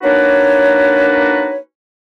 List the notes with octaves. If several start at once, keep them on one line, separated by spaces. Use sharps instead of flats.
A#3 D4 D#4 F#4 B4 C#5